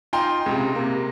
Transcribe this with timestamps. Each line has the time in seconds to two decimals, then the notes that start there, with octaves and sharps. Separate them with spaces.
0.13 D#4 F4 G5 A#5 C6
0.46 C#2 C3
0.75 C3 A#3